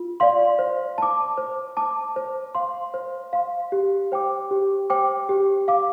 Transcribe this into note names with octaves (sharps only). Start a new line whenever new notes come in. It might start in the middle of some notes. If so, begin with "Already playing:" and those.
Already playing: F4
D5 F5 C6
C5
A5 D6
C5
A5 D6
C5
F5 C6
C5
F5 C6
G4
C5 G5 D6
G4
C5 G5 D6
G4
F5 D6